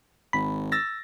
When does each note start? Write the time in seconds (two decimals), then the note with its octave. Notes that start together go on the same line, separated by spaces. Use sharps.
0.33 G#1 B5
0.72 E6 A6 A#6